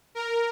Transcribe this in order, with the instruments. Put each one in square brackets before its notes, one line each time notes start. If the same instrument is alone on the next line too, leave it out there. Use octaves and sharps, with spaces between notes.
[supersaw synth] A#4